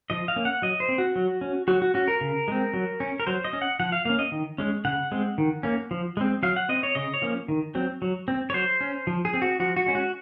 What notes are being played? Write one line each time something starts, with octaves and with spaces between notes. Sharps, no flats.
F3 D#5
F5
A#3 C#4
F#5
F#3 D#5
C5
C4
F#4
F#3
C#4
F#3 F#4
F#4
C#4 F#4
A#4
C#3
G#3 C4
F#3
C#4
A#4
F#3 C5
D#5
C#4
F#5
F3 F#5
F5
A#3 C#4 F5
D#5
D#3
G#3 C#4
C#3 F#5
G#3 C4
D#3
A#3 C#4
F3
G#3 C4
F#3 F5
F#5
C4 D#5
C#5
C#3 D#5
C#5
F3 A#3 C#4
D#3
F#3 C4
F#3
C4
C#5
F#3 C5
C#4
F3
G#4
C4
F#4
F3 F#4
F#4
G#3 C#4
F#4